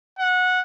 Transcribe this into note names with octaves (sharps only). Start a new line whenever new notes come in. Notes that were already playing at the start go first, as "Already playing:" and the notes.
F#5